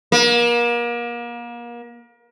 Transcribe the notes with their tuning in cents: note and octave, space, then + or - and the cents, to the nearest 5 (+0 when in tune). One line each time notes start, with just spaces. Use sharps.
A#3 +35